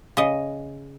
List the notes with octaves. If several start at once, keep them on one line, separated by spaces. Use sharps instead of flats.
C#3 D#5